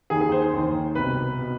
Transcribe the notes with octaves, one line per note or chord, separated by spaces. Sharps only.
D#2 D#3 G#4
G#4
C5
C5
D#2 D#3
C2 B2 B4
B2